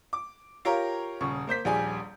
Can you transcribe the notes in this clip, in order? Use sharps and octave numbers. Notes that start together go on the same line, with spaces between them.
D6
F4 G4 A#4 C#5 F5 A#5
D#1 C#3 C#6
A#3 C5 G6 B6
D#1 A#1 G3 G#4 D5 G#5